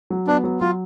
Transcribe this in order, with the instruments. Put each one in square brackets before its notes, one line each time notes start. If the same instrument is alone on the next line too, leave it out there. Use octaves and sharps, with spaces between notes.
[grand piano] F#3
[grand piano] B3 [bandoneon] D4
[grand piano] F#3
[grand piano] F#3 [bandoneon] F4